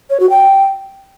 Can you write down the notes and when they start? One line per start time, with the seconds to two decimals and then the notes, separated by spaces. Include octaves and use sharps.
0.10 C#5
0.20 F#4
0.30 G5